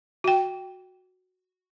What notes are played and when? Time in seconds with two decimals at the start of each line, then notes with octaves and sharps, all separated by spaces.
0.24 F#4 G5